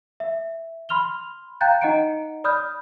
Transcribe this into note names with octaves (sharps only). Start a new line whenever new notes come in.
E5
B5 C6 F6 F7 G7
F5 G5 A#5 F#6 G6 A6
D#4 D#5 F#5 A#5 C#7 D7
D5 B5 D#6 F6 G6